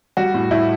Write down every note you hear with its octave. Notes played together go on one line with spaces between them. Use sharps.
G3 F#4
A2
A2 E4